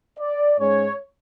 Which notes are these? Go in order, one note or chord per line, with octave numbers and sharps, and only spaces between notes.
D5
G#2 G#3 C#4 C#5